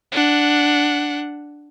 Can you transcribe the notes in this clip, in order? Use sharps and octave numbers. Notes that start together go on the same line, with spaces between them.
D4 F#5